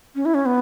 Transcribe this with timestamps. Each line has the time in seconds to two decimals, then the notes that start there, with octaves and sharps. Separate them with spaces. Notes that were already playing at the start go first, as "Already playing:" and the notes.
0.15 C#4
0.25 E4
0.34 C#4
0.46 B3